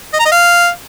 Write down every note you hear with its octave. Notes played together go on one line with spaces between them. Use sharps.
D#5
A#5
D#5
F5